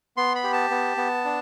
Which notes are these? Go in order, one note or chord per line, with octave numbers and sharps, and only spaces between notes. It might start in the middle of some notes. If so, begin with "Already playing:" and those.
B3 C6
B5
G4
A5
B3
B3
D4